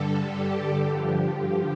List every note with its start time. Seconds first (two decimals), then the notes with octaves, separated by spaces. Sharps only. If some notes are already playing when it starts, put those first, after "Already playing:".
Already playing: G2 D3 G3 A4
0.26 G4
0.89 G2 D3 F3